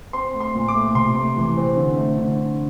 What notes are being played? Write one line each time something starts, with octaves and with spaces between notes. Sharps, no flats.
C4 C6
A3
C6
A#2
D6
A3
C3 C6
A3
E3
C4
D3
A3
D3